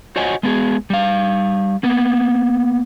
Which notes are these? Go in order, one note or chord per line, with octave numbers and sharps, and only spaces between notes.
F#4 C5 C#5 D#5 F#5 G#5
G#3 B3 G#4
G3 F5
A#3 B3